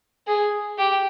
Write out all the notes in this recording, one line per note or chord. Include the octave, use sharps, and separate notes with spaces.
G#4
G4